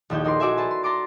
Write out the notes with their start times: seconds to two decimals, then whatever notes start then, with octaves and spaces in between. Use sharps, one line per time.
0.10 A#1 D#2 E4 G6
0.24 D#4 A#4 D5 C6
0.40 F#4 D5 E5 G#5
0.57 B4 C5 A5
0.71 C6
0.83 A5 A#5 C6 D6 A6